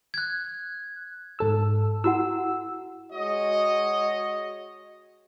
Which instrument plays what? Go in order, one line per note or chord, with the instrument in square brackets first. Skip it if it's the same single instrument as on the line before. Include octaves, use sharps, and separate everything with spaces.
[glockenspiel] F#6 G#6
[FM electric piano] G#2 A4 E6
[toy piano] E4 F#4 F#5 [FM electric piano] E6
[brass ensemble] G#3 F#4 C#5 D#5